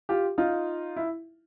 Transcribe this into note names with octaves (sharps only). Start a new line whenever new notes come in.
F4 G4
D#4 F4
E4